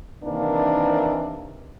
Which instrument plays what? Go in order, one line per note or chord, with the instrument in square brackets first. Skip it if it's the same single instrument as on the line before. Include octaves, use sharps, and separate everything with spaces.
[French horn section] C3 D#3 E3 A#3 D4